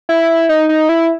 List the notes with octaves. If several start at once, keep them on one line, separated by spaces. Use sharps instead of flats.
E4
D#4
D#4
E4